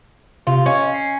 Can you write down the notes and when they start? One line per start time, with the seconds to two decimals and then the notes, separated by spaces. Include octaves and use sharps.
0.47 C3 F4
0.66 C#4 D#5
0.94 C7